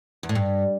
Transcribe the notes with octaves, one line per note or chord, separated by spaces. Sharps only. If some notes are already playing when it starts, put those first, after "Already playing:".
E2
A2
G2